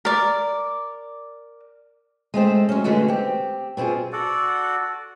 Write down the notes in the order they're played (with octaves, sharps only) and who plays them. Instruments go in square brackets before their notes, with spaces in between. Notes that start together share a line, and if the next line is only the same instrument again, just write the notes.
[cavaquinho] A#4 D5
[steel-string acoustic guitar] G#3 A3 C4 C5
F#3 C#4
D3 E3 G#3 A3 F#4
C4 G4
B2 C4 E4 F4 G#4
[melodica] F#4 A4 D5 F#5